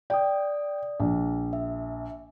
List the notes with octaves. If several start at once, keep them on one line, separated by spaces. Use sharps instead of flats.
D5 G5 D#6
A#1
E5